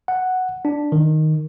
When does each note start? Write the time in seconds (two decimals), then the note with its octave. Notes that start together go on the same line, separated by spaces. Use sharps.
0.08 F#5
0.65 D4
0.92 D#3